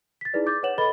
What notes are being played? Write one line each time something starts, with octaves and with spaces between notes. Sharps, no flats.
A6 B6
D#4 E4 G#4 B4 D5
D6 G6 A6
B4 C#5 F#5 E7 F#7
A4 B4 D#5 B5 A6 G7